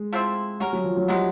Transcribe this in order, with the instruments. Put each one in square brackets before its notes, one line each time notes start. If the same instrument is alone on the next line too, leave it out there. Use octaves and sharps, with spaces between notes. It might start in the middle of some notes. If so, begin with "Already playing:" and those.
Already playing: [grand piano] G#3
[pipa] F3 A3 C4 E4
[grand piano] G3 [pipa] C#4 F#4 A#4
[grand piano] F#3
F3
F#3
[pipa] C3 D#3 G#3 B3 [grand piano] G3